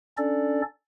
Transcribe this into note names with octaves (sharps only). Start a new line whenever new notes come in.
C#4 D4 A4 D5